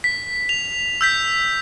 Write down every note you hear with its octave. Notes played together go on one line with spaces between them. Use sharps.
B6
F7
E6 G6 B6